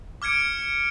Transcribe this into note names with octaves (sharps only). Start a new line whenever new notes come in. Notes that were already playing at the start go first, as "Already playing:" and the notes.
D6 F6 G#6 C#7 D7